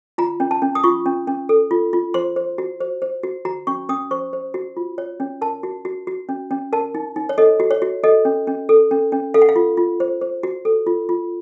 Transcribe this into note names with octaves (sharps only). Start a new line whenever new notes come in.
F4 A#5
C#4
A5
C#4
D#6
F4 C#6
C#4
C#4
A4
F4
F4
C5 C6
C5
F#4
C5
C5
F#4
F#4 A#5
C#4 C#6
C#4 D#6
C5 C#6
C5
F#4
F4
C#5
C#4
A#4 A5
F#4
F#4
F#4
C#4
C#4
A#4 A5
D#4
D#4
C#5
A4 D#5
F#4
C#5
F#4
A4 D#5
C#4
C#4
A4
C#4
C#4
A4 F5
F#5
F5
F4
F4
C5
C5
F#4
A4
F4
F4